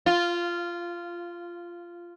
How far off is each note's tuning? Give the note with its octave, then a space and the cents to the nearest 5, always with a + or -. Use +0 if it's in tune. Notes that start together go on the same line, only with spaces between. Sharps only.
F4 -10